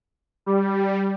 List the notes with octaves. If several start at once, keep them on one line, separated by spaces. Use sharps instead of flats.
G3